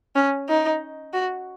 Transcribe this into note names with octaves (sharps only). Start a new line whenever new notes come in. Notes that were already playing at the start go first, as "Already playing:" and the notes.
C#4
D#4
F#4